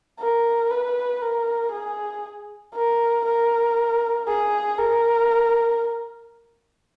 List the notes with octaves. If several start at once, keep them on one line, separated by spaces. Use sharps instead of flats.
A#4
B4
A#4
G#4
A#4
A#4
G#4
A#4